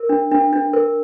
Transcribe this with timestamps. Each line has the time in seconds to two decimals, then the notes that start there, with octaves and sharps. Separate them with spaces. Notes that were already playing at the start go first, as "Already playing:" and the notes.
Already playing: A#4
0.09 D4
0.31 D4
0.53 D4
0.73 A#4